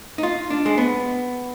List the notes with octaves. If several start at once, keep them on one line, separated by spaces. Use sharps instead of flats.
D#4
F4
D4
G#3
B3